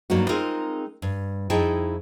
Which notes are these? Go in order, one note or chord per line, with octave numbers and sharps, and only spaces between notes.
G2 F#3 A#3 D#4 F#4
G#3 C4 D#4 F4 G#4 A#4
G2
F2 D#4 E4 G#4 G5 A5